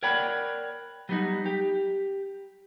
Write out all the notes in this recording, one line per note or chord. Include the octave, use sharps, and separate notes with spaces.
A#4 C#5 D5 F#5 G5 B5
F#3 G3 B3 D#4 F#4
G4